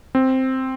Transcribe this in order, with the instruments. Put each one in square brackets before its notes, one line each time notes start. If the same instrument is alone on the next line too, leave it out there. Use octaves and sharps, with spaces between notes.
[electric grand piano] C4